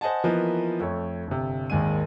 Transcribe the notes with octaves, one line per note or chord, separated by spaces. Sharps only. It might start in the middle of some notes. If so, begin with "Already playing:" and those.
C5 D#5 F#5 G#5 A5
E3 F3 A#3 B3 A#4 D#5
F2 A3 C#5
G1 C3
G#1 D#2 G#3 G#5 D#7